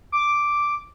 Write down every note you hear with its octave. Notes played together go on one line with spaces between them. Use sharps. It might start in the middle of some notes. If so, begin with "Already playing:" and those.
D6